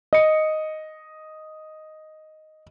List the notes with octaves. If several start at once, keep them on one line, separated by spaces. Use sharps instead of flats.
D#5 C#7